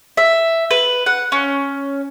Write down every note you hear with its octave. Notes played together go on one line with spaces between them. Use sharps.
E5
B4
F#5
C#4